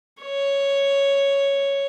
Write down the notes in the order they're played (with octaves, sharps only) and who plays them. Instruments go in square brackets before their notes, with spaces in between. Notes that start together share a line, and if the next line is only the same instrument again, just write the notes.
[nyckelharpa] C#5